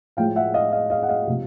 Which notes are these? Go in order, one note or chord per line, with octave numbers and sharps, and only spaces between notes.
A2 F3 G#3 F5 G5
E5 F#5
D#5 F5
D#5 F5
D#5 F5
F#5
D#5 F5
C3 F3 G#3